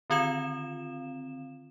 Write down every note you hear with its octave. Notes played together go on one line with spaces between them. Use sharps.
D3 D#3 C4 F4 F5 E7